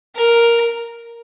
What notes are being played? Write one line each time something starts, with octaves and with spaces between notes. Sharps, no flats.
A#4